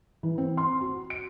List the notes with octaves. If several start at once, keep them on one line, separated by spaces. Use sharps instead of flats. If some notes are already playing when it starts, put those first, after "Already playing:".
E3
C4
C6
F#4
D7